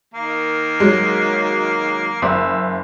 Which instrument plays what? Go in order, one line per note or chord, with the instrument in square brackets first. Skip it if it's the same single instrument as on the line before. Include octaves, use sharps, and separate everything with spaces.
[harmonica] D#3 A#3
[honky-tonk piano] F#3 G#3
[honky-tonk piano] F#1 [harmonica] E6